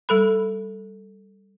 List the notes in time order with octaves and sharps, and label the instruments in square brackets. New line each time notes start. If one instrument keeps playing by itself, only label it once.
[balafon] G3 A4 B5